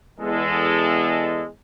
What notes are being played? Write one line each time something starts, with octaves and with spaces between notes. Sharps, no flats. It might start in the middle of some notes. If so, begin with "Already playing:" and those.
E2 G#3 A4